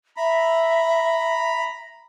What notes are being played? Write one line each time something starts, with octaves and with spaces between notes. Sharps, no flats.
E5 A#5 B5